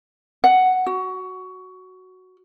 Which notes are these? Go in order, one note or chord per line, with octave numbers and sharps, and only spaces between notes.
F#5
F#4